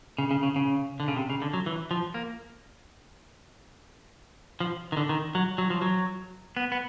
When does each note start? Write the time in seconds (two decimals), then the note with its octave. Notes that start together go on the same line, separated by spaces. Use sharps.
0.18 C#3
0.31 C#3
0.43 C#3
0.56 C#3
1.00 D3
1.08 C#3
1.16 C3
1.30 C#3
1.42 D3
1.54 F#3
1.66 E3
1.91 F3
2.14 A#3
4.60 F3
4.92 D#3
4.97 D3
5.09 D#3
5.35 F#3
5.58 F#3
5.70 F3
5.82 F#3
6.57 B3
6.72 B3